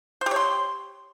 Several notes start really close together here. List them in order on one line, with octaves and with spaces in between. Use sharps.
C5 G4 C#5 C6